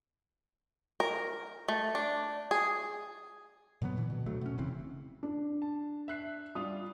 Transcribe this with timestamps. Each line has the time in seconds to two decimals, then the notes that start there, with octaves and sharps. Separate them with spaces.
1.00 A#4
1.68 A3
1.95 D4
2.51 G#4
3.82 A#2 D3 F#3 B3
3.96 A#2 D3 E3
4.10 B2
4.26 D2 F#3 A3
4.41 B2 C#4
4.58 F1 C#3 E3 C4
5.23 D4
5.62 A5
6.08 E5 F#6 C7
6.55 G3 D4 F4 D#6